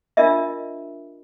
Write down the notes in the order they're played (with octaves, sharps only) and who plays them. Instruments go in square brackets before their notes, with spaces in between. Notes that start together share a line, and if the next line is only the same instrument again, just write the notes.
[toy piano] D4 F4 A#4 D#5 E5